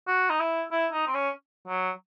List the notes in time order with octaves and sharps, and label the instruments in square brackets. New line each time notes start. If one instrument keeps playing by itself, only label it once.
[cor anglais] F#4
D#4
E4
E4
D#4
C4
C#4
F#3